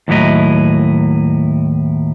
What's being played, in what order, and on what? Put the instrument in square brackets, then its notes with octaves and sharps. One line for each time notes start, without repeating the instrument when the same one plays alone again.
[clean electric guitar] D#2 A2 F#3 E4 D#5